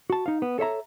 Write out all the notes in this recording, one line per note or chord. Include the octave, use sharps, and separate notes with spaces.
F#4 A5
D#4 F5
B3
A4 C#5 E5 A#5